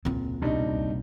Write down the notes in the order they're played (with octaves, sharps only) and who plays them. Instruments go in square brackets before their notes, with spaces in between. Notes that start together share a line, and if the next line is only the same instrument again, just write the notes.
[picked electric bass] E1 C#2 A#2 [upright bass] C4 F4
[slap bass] C2 B2 [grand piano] G3 D4 D#4